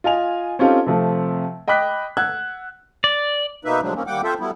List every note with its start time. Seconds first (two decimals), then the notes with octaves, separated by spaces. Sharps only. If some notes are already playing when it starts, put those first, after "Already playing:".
0.04 F4 D#5 G#5 F7
0.59 C4 C#4 D#4 F4 G4 A4
0.86 C3 F3 A3 C4
1.68 D#5 G5 B5 D6 F#6 B6
2.17 F#5 E6 F#6 G#6
3.04 D5
3.65 B2 A#3 D#4 B4 E5
3.82 A2 C3 F3 F#3 G#3 D4
3.95 D#3 A#3 C4 C#4
4.07 D#2 G3 A#3 F#5 G5 D6
4.24 C4 F4 A4 C5 E5
4.40 F#3 G3 A3 B3 E4